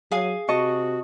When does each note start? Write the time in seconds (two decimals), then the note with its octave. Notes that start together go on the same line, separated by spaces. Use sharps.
0.11 F#3 G#4 F5 G#5
0.48 C3 F#4 D#5 A5 C#6